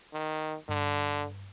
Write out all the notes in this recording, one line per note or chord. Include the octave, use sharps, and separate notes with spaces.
D#3
G2 D3